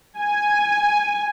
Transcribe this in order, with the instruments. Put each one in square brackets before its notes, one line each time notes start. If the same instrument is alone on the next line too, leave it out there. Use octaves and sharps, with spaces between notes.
[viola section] G#5